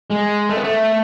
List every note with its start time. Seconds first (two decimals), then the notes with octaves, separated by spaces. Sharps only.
0.11 G#3
0.49 A3
0.57 B3
0.64 A3